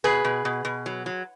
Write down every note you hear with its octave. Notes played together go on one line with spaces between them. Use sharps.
B2 G#4 B4
B2
B2
B2
F#3
F#3